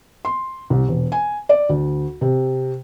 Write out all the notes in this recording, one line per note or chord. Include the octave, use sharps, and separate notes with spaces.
C6
C2
E1
G#5
D5
D2
C3